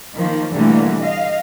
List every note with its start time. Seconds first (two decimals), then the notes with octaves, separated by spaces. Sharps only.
0.16 D#3 F3 A#3
0.53 B2 D3 E3 G3 A3 A#3
1.00 D#5 F5